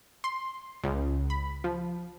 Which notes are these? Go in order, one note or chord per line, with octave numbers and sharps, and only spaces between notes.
C6
C#2
B5
F3